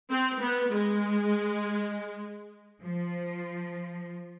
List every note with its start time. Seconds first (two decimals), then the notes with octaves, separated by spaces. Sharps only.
0.10 C4
0.41 B3
0.71 G#3
2.83 F3